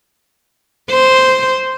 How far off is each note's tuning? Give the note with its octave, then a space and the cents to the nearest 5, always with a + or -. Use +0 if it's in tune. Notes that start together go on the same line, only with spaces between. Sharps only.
C5 -5